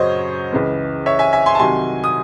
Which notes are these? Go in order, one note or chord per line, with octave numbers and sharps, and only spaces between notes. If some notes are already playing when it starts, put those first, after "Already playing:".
Already playing: F#2 C#3 F#3 C5 C#5 D#5
C#2 C#3 E3
C#5 E5
E5 G#5
E5 G#5
G#5 C6
A5
C2 C3 D#3 F#3 G#5 C6
D#6